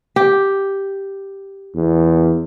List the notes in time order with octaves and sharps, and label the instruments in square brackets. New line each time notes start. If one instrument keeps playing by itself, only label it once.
[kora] G4
[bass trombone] E2